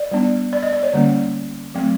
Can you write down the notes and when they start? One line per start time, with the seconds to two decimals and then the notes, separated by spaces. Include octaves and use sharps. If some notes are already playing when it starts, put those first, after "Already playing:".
Already playing: D5
0.12 G3 B3 D4
0.53 D5
0.63 D#5
0.73 D5
0.83 C#5
0.93 D3 G3 A#3 C#4
1.75 F#3 A3 C4